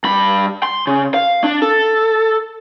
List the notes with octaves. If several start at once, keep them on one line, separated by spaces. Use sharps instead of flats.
G2 B5
C6
C#3
F5
D4
A4